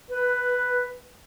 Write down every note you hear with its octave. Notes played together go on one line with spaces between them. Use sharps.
B4